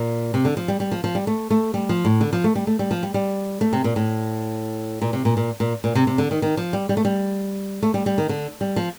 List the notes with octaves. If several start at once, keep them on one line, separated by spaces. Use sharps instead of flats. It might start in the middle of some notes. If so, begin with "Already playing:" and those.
Already playing: A#2
C3
D3
F3
G3
G3
F3
F3
G3
A3
A3
G3
F3
A2
D3
F3
A3
G3
A3
G3
F3
G3
G3
A3
C3
A#2
A2
A#2
C3
A#2
A#2
A#2
A#2
C3
C3
D3
D#3
D#3
F3
G3
G3
A3
G3
A3
G3
G3
D#3
D3
G3
F3